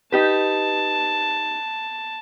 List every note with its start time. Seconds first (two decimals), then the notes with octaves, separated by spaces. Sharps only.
0.12 D#4 G4 B4 A5